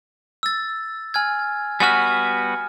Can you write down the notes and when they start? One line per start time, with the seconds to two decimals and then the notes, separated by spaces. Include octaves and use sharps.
0.43 E6 A6
1.14 G#5 F6 G#6
1.80 G3 B3 F#4 G#5 F6